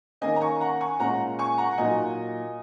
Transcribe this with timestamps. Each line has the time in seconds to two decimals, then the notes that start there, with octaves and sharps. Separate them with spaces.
0.21 D#3 A#3 C#4 D#5 G#5
0.36 A#5
0.41 G#5 C#6
0.61 F#5 A#5
0.81 G#5 C#6
0.99 A#2 G#3 C#4 F#5 A#5
1.39 G#5 C#6
1.58 F#5 A#5
1.71 F#5
1.78 A#2 F#3 D#4 D#5 G#5